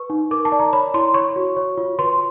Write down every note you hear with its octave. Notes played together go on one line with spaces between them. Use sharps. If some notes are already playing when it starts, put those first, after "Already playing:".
Already playing: B4 C#6
D#4
A#4 D6
A5
D5
A#5
C#5 B5
E4 C6
C#5 C#6
F#4
C#5
F4
B4 C6